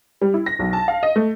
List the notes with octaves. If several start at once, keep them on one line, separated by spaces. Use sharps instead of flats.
G3
E4
A#6
B1
A5
F5
D#5
A3